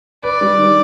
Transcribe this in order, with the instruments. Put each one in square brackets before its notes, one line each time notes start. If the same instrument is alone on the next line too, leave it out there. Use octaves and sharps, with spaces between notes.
[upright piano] B4 [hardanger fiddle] D5
[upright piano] G3
D#3